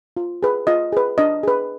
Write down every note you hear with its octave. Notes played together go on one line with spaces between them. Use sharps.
F4
G#4 B4
F4 D#5
G#4 B4
D4 D#5
G#4 B4